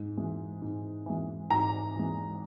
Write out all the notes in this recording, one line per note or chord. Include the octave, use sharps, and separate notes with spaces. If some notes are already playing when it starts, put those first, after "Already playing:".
Already playing: G#2
E3 G#3
G#2
E3 G#3
G#2 A#5
E3 G#3